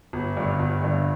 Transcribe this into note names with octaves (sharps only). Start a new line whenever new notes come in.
G1
G2 D3
G1
G2 D3